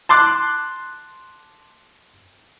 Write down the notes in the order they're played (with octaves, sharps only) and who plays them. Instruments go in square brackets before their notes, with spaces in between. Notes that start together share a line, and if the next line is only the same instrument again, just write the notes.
[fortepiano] A5 C6 D6 F#6